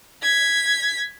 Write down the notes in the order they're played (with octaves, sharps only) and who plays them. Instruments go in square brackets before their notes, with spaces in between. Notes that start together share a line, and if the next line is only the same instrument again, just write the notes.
[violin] G#6 B6